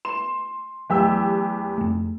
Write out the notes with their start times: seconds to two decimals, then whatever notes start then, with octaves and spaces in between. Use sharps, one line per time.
0.05 C6 E7
0.90 E2 E3 F#3 A3 G4 E6
1.78 F2 A3